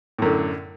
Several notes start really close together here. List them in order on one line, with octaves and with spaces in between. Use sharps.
A2 F#2 D3